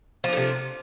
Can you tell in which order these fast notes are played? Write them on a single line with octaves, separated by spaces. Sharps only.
F3 D4 A3 C3